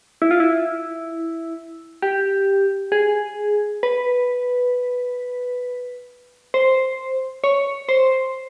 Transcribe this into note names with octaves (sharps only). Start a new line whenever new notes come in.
E4
F4
E4
G4
G#4
B4
C5
C#5
C5